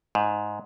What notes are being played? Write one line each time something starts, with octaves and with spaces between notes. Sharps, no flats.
G#2